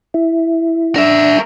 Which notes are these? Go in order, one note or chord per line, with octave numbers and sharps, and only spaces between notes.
E4
D4 A#4 E5